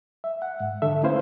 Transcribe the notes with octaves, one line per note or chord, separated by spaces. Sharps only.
E5
F#5
G#2
D3 A4 E5
A3 C#4 E4 B4 C5 F5